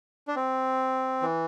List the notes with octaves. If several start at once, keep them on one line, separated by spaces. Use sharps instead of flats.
D4
C4
E3